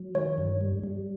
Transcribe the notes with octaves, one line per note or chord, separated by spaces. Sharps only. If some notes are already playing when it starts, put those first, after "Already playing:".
Already playing: F#3
D#3 C#5
G2
G3
G3